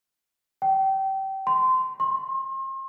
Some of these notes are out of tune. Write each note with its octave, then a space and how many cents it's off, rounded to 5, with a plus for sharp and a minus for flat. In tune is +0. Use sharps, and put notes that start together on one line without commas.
G5 -25
C6 -20
C6 +40